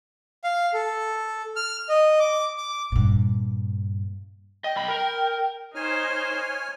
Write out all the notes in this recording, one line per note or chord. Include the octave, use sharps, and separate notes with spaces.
F5
A4
F6
D#5
D6
D6
G2 A#2
D#5 G5
B1 B5
A#4
D#4 C5 C#5 G#5 F6